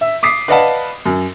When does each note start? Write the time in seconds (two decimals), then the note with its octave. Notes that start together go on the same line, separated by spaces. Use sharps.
0.01 E5
0.23 D6 D#6 B6 C7
0.48 B4 D5 D#5 F5 F#5 A5
1.06 F#2